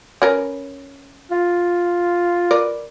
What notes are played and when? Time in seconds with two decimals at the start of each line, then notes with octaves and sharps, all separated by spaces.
0.22 C#4 A#4 B4
1.31 F4
2.51 A#4 B4 D5